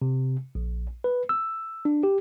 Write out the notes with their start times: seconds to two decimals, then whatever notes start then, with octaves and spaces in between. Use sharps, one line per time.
0.02 C3
0.55 A#1
1.04 B4
1.29 E6
1.85 D4
2.03 G4